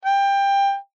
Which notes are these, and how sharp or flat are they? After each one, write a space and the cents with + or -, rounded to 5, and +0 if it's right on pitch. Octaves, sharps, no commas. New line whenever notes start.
G5 +20